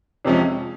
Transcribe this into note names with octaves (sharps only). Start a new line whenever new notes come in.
F2 C3 F3 G#3 C#4